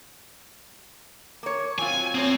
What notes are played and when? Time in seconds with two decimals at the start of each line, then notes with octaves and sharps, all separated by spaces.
1.43 A#3 C#5
1.79 F#3 C4 F4 G#5
2.15 F#2 C4 C#5